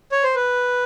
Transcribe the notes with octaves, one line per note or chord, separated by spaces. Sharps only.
C#5
C5
B4